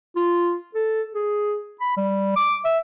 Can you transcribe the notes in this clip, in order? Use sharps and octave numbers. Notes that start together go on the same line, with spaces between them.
F4
A4
G#4
B5
G3
D6
E5